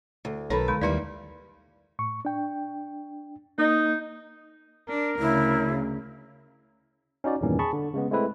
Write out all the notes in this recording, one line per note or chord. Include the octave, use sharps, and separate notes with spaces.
D2
B1 D#3 A4 B4 C#5 B5
D3 G#3 B5
D#2 G3 A#3 D#4 E4 B4 D5
A2 C#6
D4 G5
A#3 D#4
D4 A#4
D2 C#3 E4
C#4 D#4 F#4 D5
E2 G2 A#2 D#3 E3 C#4
G#4 A5 B5 C#6
D3
C#3 G#3 B3
G#3 A3 C4 E4 B4